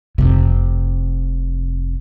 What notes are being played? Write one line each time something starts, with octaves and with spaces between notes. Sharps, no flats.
F1 C3